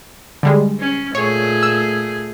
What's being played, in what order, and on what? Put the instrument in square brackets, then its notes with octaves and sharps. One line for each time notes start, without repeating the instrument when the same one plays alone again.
[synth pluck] D3 G3 G#3
[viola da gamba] C#4
[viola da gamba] A#2 A3 G#4 [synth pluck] C#5
[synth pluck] E6